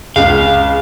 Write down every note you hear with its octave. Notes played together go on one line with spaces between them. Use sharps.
C#2 F5